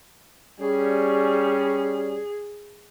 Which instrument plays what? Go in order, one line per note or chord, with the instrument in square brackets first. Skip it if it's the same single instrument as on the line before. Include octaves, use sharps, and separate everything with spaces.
[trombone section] G3 C#4 [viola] G#4